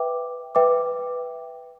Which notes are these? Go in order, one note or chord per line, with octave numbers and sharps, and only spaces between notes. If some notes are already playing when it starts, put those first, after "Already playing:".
Already playing: B4 E5 G5 D6
B4 E5 G5 D6